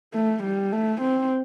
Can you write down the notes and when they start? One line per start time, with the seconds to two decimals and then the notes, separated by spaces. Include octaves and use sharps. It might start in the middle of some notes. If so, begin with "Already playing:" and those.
0.13 A3
0.43 G3
0.73 A3
1.01 C4